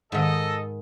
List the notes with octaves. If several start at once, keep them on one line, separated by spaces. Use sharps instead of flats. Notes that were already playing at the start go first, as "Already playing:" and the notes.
G#2 D#3 A4 D#5